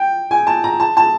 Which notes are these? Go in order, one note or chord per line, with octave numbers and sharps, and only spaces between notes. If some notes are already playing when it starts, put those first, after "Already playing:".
Already playing: G5
G#5
A5
A#5
A5
A5